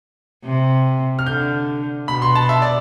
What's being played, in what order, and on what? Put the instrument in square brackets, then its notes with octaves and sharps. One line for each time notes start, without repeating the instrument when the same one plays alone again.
[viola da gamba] C3
[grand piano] F6
[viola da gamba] D3 [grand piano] G6
[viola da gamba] B2 [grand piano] B5
[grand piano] C6
A5
E5
D5